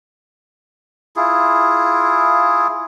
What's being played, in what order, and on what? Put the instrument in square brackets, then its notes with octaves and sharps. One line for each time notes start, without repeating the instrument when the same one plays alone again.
[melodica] E4 F4 G#4